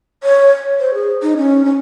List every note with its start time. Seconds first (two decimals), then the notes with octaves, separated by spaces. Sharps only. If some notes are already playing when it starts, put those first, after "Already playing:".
0.23 C#5
0.80 C5
0.94 G#4
1.22 D#4
1.37 C#4
1.65 C#4